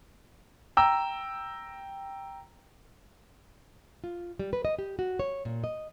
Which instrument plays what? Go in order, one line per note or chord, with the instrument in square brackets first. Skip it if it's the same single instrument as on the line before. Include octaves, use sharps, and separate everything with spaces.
[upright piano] G5 A#5 E6
[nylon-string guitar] F4
G3
B4
D#5
G4
F#4
C#5
A#2
D#5